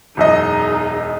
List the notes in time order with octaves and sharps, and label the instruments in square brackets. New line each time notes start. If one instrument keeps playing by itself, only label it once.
[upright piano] E1 F#2 D#5 [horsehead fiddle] D#4 G#4